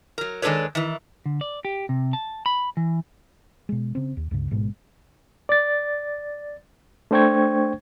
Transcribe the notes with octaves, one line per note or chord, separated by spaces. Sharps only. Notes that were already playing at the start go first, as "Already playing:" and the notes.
F#3 A#4
D#3 G#3 D4 A4 B4 C#5
D#3 E3
D3
D5
G4
C3
A5
B5
E3
B2 G#3
C#3 C4
D#2
C#2 G2 C#3
A1 G#2 B2 G#3
D5 A6
A3 D4 C5 G5 C#6 G#6